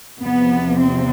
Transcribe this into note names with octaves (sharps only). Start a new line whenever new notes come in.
E2 C3 F3 B3
C4